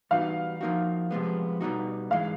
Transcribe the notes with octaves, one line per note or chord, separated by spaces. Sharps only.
E3 G3 B3 D#4 F#4 F5
F3 A#3 D#4 F#4
C3 F3 G#3 B3
B2 G3 B3 D#4 F#4
G#2 E3 G#3 F5